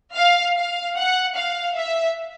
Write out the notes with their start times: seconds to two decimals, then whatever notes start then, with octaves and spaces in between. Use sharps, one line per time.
0.15 F5
0.56 F5
0.96 F#5
1.36 F5
1.76 E5